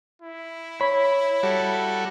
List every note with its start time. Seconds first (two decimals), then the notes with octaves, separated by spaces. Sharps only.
0.22 E4
0.81 C#5 B5
1.43 G3 F#4 A4